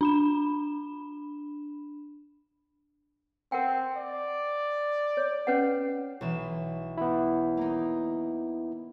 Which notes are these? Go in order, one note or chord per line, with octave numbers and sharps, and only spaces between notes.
D4 B5 E7
C4 A#4 F#5 G5
D5
C#5
C#4 B4 F#5
B1 E3 E7
B3 E4
A#3 D#4